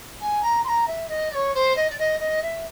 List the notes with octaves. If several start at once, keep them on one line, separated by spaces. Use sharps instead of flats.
G#5
A#5
C6
A#5
E5
D#5
D5
C#5
C5
D#5
D5
D#5
D#5
E5